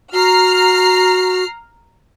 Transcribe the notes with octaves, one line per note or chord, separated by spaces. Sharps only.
F#4 A#5 F6 C7